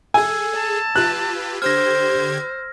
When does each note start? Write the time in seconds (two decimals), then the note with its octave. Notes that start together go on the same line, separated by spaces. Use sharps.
0.14 G#4 A4 G#5 E6 G#6
0.54 A5
0.95 F4 G4 B4 F#6
1.62 D3 G4 C5 F6 G#6 A#6